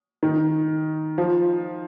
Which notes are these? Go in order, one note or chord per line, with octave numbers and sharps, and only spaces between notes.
D#3
F3